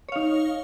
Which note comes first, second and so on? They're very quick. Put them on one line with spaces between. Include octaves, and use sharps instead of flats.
C#5 F5 D#4